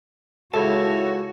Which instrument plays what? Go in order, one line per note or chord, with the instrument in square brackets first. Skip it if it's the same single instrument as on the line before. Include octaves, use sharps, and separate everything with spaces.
[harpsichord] C#2 [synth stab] E4 A4 [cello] F#4 [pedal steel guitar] C#5 E5 A5